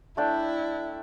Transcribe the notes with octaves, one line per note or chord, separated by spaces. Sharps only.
A3 D4 E4 G5